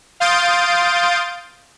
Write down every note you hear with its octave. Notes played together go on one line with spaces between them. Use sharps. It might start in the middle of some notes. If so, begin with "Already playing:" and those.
F5 C6 D#6 G6 A6 D7